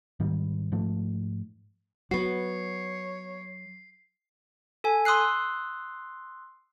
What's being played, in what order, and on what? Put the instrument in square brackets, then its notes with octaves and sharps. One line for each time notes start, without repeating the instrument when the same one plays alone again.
[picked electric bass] G#2 D#3 G3
G#2 F3 A3
[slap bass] F#3 [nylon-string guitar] B3 F#4 [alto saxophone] C#5 [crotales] C7
[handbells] A4 G#5
C6 D#6 E6 F#6 C7